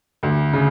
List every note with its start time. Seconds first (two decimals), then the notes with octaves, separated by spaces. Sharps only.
0.23 D2
0.53 C#3